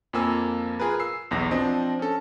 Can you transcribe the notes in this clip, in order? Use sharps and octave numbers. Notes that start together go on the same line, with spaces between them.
F2 F3 A#3 G#5 E6
F4 G#4 A#4 B4
E6 C7
B1 E2 A#6
F3 C4 D4 D#5
C#4 A4